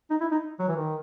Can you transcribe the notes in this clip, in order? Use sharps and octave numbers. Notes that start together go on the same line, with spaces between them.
D#4
E4
D#4
F#3
E3
D#3